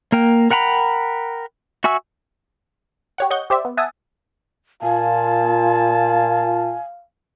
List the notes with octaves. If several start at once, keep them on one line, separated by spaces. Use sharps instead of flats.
A#3 A#4 G5
A#4 F#5 G5 A#5 B5
F#4 E5 G#5 C#6 E6
G4 C#5 F#5
C#5 D#5 F#5 C#6 G6
G4 C5 D5 E5
B3
E5 F#5 G#5 A5 D#6
A#2 F4 F5 G#5 A5